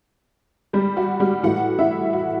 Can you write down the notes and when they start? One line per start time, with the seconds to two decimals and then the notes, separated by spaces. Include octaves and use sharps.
0.73 G3 G4
0.97 F#4
1.20 G3 G4
1.43 A2 E3 G3 F#4 F#5
1.79 E4 E5
2.13 F#4